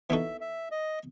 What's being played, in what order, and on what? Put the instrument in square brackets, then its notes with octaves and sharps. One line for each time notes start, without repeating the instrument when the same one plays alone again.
[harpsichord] E3 B3 D#4 F#4 A4 [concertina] E5
[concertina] E5
D#5